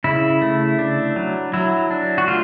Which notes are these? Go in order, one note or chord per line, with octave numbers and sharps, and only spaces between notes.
C#3 E4
A3
D4
F#3
F#3 E4
D4
F#4
A3 F4